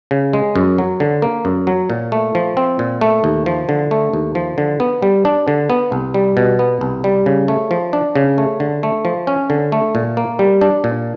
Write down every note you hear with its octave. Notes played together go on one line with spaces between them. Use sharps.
C#3
G#3
F#2
F#3
D3
A#3
F#2
F#3
A#2
A3
F3
C4
A#2
A3
D#2
F3
D3
A3
D#2
F3
D3
B3
G3
D4
D3
B3
C2
G3
B2
B3
C2
G3
C#3
A3
F3
D4
C#3
A3
D3
A3
F3
C#4
D3
A3
A#2
A#3
G3
D4
A#2